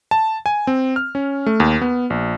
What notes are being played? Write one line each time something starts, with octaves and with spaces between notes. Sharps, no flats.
A5
G#5
C4
F6
C#4
A3
D#2
B3
A#1